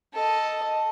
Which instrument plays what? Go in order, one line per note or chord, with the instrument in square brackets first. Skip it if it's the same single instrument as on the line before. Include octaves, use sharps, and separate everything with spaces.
[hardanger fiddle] A4 D#5